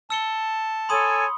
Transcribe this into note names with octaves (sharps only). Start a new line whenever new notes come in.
A5 E6 C#7 G7
A4 C#5 G#5 B5 C6 D#6